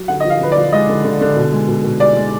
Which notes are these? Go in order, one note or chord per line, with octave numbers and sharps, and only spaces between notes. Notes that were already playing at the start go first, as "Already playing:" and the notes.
Already playing: F#3
D3 F#5
F3 D#5
F5
D3 B4
D5
F3
G#3 D#5
D3
D3
D3
B2
G#3
B2
B2
G#3 D5
G#3